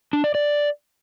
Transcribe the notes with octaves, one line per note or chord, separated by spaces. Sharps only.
D4
D5
D5